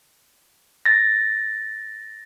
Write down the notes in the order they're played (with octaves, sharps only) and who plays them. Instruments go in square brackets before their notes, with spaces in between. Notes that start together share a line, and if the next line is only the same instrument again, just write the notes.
[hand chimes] A6 A#6